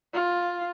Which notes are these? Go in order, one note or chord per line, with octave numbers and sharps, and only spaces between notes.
F4